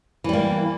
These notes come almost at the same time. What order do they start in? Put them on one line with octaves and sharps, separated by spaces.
E3 G3 A#3